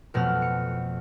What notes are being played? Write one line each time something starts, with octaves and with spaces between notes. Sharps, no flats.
F2 B2 A3 F#5 F6
C#7